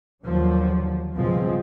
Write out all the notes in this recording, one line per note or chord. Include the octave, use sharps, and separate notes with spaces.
D#2 D3 F3 F#3
C#2 G2 B2 F3 G#3 C4